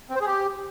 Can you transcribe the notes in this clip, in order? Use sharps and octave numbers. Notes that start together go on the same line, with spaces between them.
C4
C5
G#4
G4